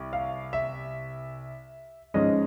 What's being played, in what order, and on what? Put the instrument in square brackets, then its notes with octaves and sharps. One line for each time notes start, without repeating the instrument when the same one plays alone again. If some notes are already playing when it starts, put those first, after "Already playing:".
Already playing: [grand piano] C2
F5
E5
G#2 F3 G#3 C#4 D#5